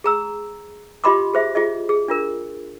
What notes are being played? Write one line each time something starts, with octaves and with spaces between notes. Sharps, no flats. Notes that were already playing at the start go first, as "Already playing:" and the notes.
G#4 A#5 E6
F4 G4 D#5 B5 C6 D6
G#4 C5 E5
F4 G#4 D#5
G#4
D4 F4 A#4